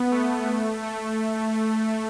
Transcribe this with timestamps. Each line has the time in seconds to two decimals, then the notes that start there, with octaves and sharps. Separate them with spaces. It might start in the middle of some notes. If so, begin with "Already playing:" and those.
Already playing: B3
0.12 A3
0.83 A3